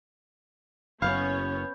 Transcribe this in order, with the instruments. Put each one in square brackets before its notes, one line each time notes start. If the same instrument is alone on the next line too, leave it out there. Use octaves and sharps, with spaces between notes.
[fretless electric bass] F#1 F#2 [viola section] B3 C#4 C#5 [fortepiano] F5 [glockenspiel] B5 G6